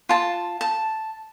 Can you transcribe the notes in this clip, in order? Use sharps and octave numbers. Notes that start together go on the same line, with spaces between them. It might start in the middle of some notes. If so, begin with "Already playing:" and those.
F4 A5
A5